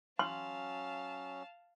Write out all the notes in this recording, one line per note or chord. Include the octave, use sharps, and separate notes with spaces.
F#3 C#4 F5 A5 C6